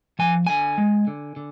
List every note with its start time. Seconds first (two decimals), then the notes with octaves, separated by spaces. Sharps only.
0.19 F3 G#5
0.47 D3 G#5
0.78 G#3
1.07 D3
1.36 D3